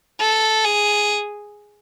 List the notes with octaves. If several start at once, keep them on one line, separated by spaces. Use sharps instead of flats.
A4
G#4